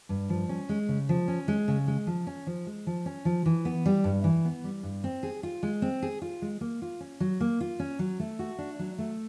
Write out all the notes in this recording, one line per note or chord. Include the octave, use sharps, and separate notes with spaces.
G2
F3
C#4
G#3
C#3
F3
C#4
G#3
C#3
G#3
F3
C#4
F3
G#3
F3
C#4
F3
E3
B3
G3
G2
E3
B3
G3
G2
C4
G#4
F4
G#3
C4
G#4
F4
G#3
A#3
F4
C#4
F#3
A#3
F4
C#4
F#3
A3
F#4
D4
F#3
A3